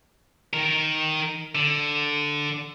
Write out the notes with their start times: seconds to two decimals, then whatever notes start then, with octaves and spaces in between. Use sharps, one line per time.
0.53 D#3 A#4
1.55 D3